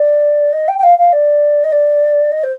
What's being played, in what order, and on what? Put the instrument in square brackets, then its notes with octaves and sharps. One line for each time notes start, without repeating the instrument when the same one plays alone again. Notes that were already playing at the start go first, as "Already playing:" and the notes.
Already playing: [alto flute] D5
D#5
G5
G5
F5
F5
D5
D#5
D5
D#5
C5